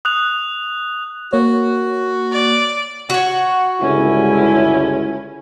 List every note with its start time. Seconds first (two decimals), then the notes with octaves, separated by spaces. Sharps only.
0.05 D#6 F#6 F7
1.33 A#3 F#4 C#5
2.32 D5
3.10 F#4 C#5 F#5
3.81 G1 C#2 D3 C#4 E4